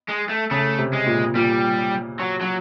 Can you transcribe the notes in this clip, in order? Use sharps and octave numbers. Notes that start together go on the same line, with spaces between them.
G#3
A3
C#3 A3
C3
G#3
A#2
A#2 G3
F#3
F#3